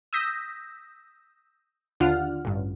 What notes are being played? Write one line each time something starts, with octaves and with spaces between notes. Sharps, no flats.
D#6 E6 G6 A#6 B6
D#2 D3 D4 F4 F#5 F6
A1 G2